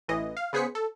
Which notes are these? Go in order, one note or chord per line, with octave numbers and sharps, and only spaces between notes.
A1 E3 D#5
F5
C#3 B3 G#4 C5 B6 C#7
A4